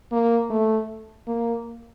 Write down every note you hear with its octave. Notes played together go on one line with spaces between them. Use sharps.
A#3
A3
A#3